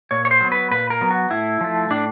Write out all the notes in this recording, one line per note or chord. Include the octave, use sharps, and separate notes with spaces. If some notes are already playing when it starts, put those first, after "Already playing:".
A#2 C#5
C#5
C5
F#3 B3
B4
A#2 B4
A#4
F#3 B3
F#4
A2 E4
F3 A3
A2 D4